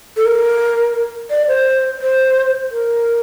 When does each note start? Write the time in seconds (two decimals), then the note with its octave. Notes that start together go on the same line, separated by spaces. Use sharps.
0.17 A4
0.25 A#4
1.30 D5
1.48 C5
2.01 C5
2.71 A#4